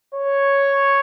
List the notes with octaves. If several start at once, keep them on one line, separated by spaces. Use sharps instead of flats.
C#5